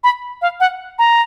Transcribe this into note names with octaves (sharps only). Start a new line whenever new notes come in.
B5
F5
F#5
A#5